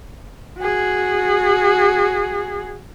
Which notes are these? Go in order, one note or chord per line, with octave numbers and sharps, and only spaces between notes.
F#4 G#4